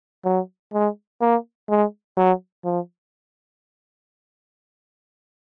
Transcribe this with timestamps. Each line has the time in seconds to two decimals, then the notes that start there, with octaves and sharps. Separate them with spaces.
0.25 F#3
0.73 G#3
1.21 A#3
1.69 G#3
2.17 F#3
2.65 F3